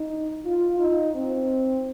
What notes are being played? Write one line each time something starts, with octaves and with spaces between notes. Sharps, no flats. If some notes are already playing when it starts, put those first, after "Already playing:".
Already playing: D#4
F4
D#4
C4